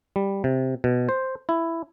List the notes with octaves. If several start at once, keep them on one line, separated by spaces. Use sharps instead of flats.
G3
C3
B2
C5
E4